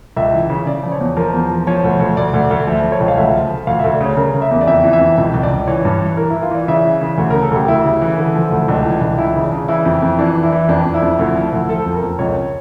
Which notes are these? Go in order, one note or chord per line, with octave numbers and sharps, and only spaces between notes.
C#2 E5
E3
C#3
C#3 D5
F3
C#5
E2
F3 A#4
E2
F3
F3 C#5
D2
D2
D2 D5
D2
D2
F3 E5
F3
C#5
C#2
F5
D2 E5
F3
F3
D2 F5
D2 E5
D5
C#3 C#5
C#3 A#4
C#3
E5
E2
D5
F2 E5
E3
E5
F2
C#2
C#2
D5
C#2
E3 C#5
G2
E3
E3 A#4
E3 E4
F4
E3 D5
C#3 E5
E3
C#3
D2
C#3 A#4
A4
D2 G4
D2 E4
C#3
E3
D3
F3
D2
C#2 D4
E3
C#2
E3 E4
C#3
D4
C#3
E3 E4
F2
F2
E3 D4
E3
E4
E3
F2 D4
F2
E4
F2
D2
F3
D2
F3 A4
F2
A#4
F2
C#2 C#5